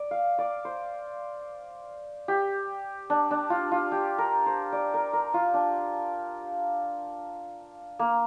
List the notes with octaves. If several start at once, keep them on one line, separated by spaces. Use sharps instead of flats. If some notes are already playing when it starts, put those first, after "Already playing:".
Already playing: D5
F5
D5
C5
G4
D4
D4
F4
F4
G4
A#4
C5
D5
A#4
A#4
F4
D4
A#3